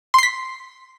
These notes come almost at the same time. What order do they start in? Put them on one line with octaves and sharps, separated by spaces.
C6 C7 B6